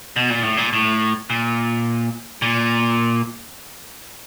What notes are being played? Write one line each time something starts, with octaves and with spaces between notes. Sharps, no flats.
B2
A#2
A2
A#2
A2
A#2
A#2